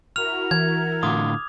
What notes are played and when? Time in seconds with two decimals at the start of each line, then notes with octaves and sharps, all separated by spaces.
0.16 E4 F#4 A#4 F6 F7
0.51 E3 G#6
1.03 A2 D3 F4 D6 D#6